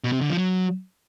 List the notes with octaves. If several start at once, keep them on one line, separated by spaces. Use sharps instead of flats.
B2
C3
D3
F3
F#3